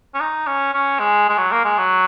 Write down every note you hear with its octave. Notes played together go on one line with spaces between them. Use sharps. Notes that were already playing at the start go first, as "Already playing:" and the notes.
C#4
D#4
C#4
C#4
G#3
G#3
F#3
A#3
G#3
F#3